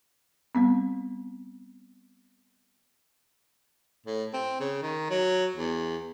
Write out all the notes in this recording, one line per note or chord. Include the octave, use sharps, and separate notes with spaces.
G3 B3 C4
A2
C4
C#3
D#3
F#3
E2